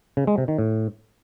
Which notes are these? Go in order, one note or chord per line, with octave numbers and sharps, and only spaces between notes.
C#3
G#3
C3
D#3
A2